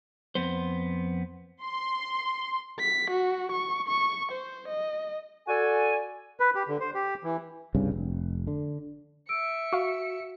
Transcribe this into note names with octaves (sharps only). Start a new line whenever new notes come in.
F2 B3 C5
C6
B6
F#4
C#6
C#6
C5
D#5
F#4 A4 D5 G#5
B4
G4
D3
C5
G4
E3
C2 G2 C#3
F1
D3
E5 E6 C#7 D7
F#4 F5 C#6